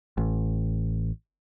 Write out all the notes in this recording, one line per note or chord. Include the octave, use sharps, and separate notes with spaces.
A1